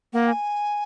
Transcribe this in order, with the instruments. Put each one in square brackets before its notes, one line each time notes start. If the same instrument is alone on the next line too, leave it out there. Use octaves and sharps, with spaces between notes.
[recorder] A#3 [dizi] F#5
[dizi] G#5